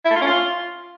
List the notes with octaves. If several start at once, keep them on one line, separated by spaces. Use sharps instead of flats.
E4
A3
F4
C#4
F4